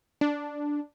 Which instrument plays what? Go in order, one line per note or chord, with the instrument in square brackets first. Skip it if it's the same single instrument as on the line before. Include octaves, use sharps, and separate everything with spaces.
[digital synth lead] D4